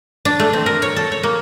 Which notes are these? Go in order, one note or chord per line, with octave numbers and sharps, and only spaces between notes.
D4
A3
C4
A#4
C#5
A4
C#5
A#3